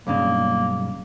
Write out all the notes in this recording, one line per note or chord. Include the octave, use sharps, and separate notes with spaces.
B1 G2 C#3 A#3